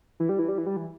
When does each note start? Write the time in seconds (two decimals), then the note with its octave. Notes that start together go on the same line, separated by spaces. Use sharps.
0.20 E3
0.29 G3
0.39 E3
0.49 G3
0.58 E3
0.66 G3
0.77 E3